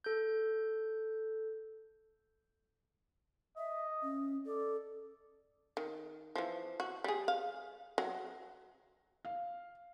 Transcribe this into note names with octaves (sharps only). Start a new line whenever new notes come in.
A4 G6
D#5 E5
C#4
A4 D5
D#3
E3 F3
F#4
G3 G#4
F5
F#3
F5